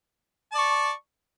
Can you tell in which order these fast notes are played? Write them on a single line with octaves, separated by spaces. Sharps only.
A5 D5 C#6